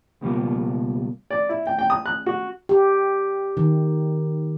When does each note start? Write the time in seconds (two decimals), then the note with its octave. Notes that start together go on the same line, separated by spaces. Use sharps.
0.21 C#2 B2 G3 A#3 F4
1.31 D5
1.49 E4
1.67 G5
1.79 G5
1.90 D#6
2.06 F#6
2.26 F#4
2.69 G4
3.57 D#3